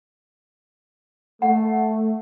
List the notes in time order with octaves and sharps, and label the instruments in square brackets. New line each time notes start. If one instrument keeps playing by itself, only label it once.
[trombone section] A3 [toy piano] F#5